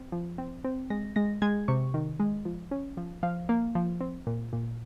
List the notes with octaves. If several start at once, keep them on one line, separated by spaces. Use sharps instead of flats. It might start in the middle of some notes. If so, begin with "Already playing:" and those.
Already playing: C4
F3
C4
C4
G#3 A#6
G#3 A#6
G#3 G#6
C3 C#6
D#3
G#3
F3
C#4
F3
F3 F5
A#3
F3
C4
A#2
A#2